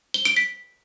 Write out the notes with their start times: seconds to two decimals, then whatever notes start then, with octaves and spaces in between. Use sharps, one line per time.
0.14 G7
0.25 D7
0.36 B6